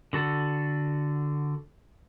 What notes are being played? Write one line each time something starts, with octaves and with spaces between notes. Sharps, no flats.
D3 F#4 A4